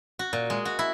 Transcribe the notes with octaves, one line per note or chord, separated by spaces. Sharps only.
F#4
A#2
G#3
F#4
E4